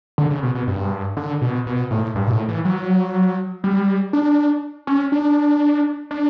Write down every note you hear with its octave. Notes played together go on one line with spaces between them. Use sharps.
D3
C#3
B2
B2
G2
D3
B2
B2
A2
G2
B2
A2
E3
F#3
G3
D4
C#4
D4
D4